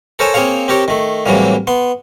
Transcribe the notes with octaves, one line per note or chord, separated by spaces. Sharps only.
A4 A#4 C5 C#5 G#5 A5
A#3 C4 G#4 C#5 F5
C4 G4 A#4 C#5
D#3 A3
A2 C3 E3 F#3 G3 A#3
B3 C6